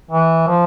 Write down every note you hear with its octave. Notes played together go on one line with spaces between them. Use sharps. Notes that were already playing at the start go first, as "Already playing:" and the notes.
E3
F3